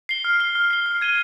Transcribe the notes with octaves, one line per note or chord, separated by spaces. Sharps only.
C7 G7
F6
C7 G7
F6
C7 G7
F6
G#6 D#7 G7